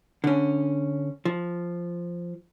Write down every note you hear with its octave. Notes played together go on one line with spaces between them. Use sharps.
D3 C#4
F3